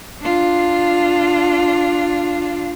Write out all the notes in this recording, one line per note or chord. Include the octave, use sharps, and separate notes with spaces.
D4 F4